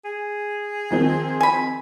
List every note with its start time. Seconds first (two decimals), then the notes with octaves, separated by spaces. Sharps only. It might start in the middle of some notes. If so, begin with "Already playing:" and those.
0.05 G#4
0.91 D#3 F3 C4
1.41 G#5 B5